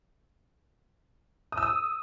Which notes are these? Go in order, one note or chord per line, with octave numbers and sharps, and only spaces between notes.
D#6
E6
D#6